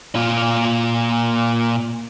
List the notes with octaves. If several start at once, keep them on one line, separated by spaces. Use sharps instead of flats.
A#2 F4